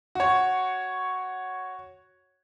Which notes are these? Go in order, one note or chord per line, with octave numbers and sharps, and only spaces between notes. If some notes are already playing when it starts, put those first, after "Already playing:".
F#4 C#5